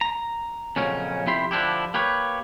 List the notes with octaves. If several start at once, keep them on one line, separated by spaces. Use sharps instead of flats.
A#5
F2 A#2 C#3 F#3 C#4
F2 C3 E4 G4 B5 C6
D3 F3 D4 E4 G4
A#3 G4 B4 C#5